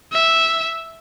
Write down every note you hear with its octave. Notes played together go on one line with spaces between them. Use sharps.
E5